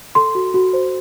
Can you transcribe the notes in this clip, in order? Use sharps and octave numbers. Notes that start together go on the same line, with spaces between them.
A4 C6
F#4
F#4
C5